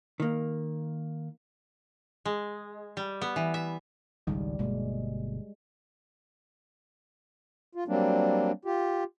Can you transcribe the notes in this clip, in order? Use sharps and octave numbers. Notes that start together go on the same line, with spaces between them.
D#3 A#3
G#3
G3
B3
E3
E5
G#1 C#2 D#3 G3
G1 B2 G#3 A#3
F4
F#3 G3 A#3 C4 D4
F4 G4